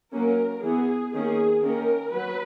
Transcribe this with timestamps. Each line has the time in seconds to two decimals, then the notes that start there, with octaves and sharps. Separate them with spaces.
0.13 F#3 A#3 C#4 A#4
0.63 E3 B3 G#4
1.13 D#3 A#3 C#4 G#4
1.63 D#3 A#3 C#4 A#4
2.13 F#3 B4